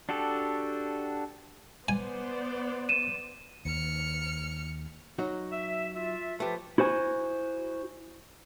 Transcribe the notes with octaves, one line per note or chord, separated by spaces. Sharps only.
D4 F#4 G4 A4
B3 C5 D5 G#5
D#7 E7
D#2 F6 C#7
F#3 D#4 F#4
E5
F4 E5
F3 A3 F4 G4 B4
E4 F#4 C5 G#5